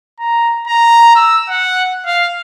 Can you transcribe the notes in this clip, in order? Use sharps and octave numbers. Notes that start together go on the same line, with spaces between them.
A#5
A#5
E6
F#5
F5